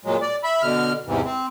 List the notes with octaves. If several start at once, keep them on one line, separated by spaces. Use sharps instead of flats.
A#2 F#3 G#3
D5
E5 B5
B2 D3 F6
E2 G#2 C3 E3
C4